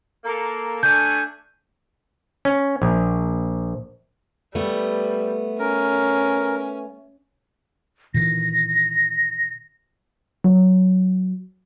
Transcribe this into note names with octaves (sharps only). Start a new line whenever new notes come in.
A#3 A4
A3 D4 G#5 G6
C#4
A#1
G3 A3 B3
C#4 A#4
A#2 D#3 E3 A#6
F#3